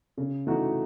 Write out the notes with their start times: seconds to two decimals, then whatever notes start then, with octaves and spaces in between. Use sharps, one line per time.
0.17 C#3
0.47 E3 A3 D#4 F#4